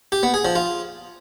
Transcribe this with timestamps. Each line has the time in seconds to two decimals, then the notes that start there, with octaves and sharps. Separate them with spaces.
0.12 G4
0.23 B3
0.34 G#4
0.45 F3
0.55 F4